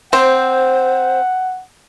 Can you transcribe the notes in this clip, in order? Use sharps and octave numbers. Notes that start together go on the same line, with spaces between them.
C4 C5 F#5